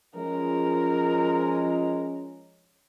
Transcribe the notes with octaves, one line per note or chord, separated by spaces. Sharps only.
F3 G#3 C#4 A#4